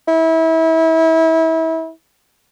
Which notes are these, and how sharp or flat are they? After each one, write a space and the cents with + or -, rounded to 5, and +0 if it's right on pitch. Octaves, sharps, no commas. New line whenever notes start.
E4 -30